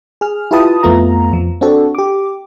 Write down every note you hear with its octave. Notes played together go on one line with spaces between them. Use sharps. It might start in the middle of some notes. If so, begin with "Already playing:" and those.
G#4 F6
E4 F4 G4 B4 A5 D#6
F2 A3 B3 F4 A#5
F2 F3
C4 D4 F#4 A4
G4 D6